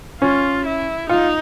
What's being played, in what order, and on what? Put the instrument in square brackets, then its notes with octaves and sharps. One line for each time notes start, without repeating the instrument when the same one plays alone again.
[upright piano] C#4 [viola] F4
[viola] E4
[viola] D#4 [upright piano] F4